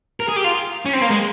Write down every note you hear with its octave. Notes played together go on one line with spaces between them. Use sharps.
A#4
G#4
G4
F4
C#4
C4
A#3
G#3